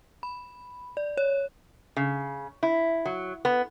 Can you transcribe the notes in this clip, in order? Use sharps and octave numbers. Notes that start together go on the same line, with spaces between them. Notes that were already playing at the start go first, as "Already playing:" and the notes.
B5
D5
C#5
C#3
E4
F#3
B3